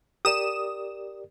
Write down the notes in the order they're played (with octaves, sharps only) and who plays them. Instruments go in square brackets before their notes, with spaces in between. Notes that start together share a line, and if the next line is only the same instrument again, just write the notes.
[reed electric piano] G4 A#4 D5 [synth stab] D#6 E7